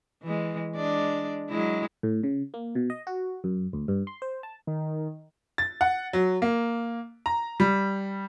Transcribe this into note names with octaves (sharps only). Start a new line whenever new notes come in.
E3 G#3
G#3 D4 D5
F#3 G#3 E4
A2
C#3
A#3
B2
D#5
F#4
F#2
D2
G2
C6
C5
A5
D#3
A6
F#5
F#3
A#3
A#5
G3